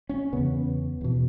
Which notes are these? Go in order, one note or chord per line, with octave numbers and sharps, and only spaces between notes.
C#4
E2 C#3 B3
E2 B2